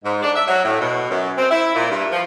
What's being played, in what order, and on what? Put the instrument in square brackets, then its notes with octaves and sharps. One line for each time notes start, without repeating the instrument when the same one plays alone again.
[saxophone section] G#2
D4
E5
F#3
A2
B2
F#2
C4
E4
A#2
G2
F3